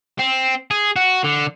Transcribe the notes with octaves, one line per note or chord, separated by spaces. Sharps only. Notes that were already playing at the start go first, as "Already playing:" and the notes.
C4
G#4
F#4
D3